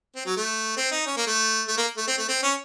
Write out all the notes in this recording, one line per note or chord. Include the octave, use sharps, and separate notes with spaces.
C4
F#3
A3
C4
D#4
C#4
A#3
A3
A3
A#3
A3
C4
A3
C4
C#4